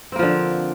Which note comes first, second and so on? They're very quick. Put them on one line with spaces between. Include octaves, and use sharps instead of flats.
C4 A#3 F3 D3